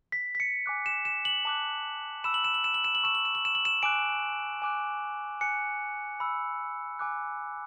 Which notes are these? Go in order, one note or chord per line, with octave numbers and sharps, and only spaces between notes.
B6
B6
C#7
G#5 D6 F#6
E7
E7
F#7
A5 D6 F#6
B5 E6 E7
F#7
E7
F#7
E7
F#7
E7
F#7
A5 C#6 E6 E7
F#7
E7
F#7
E7
F#7
E7
G#5 D6 F#6 D7
G#5 D6 F#6
G#5 D6 F#6 C#7
B5 E6
G#5 D6 F#6